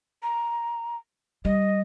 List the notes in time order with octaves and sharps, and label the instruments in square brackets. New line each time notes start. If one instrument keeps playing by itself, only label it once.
[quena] A#5
[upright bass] G3 [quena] D#5